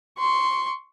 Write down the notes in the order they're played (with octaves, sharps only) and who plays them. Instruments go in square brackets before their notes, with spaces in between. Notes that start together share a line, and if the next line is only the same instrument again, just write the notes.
[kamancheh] C6 C#6